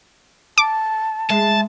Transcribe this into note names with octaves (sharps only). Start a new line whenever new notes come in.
A5 D6
G#3 E5 A5